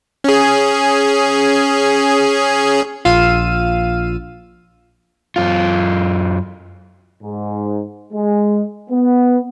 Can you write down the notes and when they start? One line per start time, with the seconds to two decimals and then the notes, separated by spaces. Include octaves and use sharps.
0.24 C#4 G#4
3.05 A#1 F4 F5 E6 D#7
5.36 F#2 F4
7.23 G#2
8.13 G#3
8.91 B3